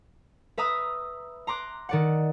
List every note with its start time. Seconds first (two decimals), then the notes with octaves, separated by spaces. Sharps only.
0.58 B4 E5 A#5 D#6
1.47 A#5 C6 D6 F#6
1.89 D#3 D5 F#5